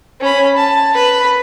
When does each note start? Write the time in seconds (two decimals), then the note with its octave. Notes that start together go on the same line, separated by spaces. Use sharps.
0.20 C#4 B5
0.57 A5
0.95 B4 B5